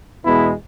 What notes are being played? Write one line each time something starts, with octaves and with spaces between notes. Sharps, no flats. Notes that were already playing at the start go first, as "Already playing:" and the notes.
E2 B2 G#3 B3 E4